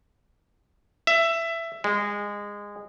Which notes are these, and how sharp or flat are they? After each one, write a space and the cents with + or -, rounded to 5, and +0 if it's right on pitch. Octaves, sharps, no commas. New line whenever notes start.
E5 +15
G#3 -20